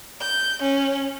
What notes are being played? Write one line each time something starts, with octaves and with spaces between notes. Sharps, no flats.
G6
C#4